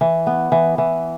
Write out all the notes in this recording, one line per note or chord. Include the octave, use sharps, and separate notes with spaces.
E3
B3
E3
E3